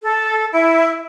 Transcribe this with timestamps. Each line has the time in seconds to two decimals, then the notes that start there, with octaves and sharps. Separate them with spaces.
0.04 A4
0.52 E4